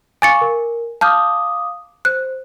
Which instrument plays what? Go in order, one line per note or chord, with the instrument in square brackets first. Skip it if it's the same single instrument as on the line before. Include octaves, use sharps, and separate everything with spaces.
[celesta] F5 C#6 D6 [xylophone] G#5 A6 C#7
[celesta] A#4
[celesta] F5 D6 D#6 [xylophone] A5 F6 G6
[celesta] C5 [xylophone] F#6